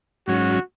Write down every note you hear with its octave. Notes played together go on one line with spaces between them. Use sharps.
G#2 F#3 C#4 F#4